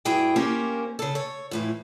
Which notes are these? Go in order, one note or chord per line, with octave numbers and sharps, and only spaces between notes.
G2 E4 F#4 G#4 G5
A#3 C#4 G4 A#4 C5
C#3 A4
C#5
F2 A2 E3